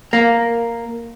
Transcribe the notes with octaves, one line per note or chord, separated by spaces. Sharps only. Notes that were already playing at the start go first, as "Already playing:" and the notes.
A#3